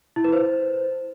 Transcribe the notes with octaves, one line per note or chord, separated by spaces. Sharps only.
E4
B4
C5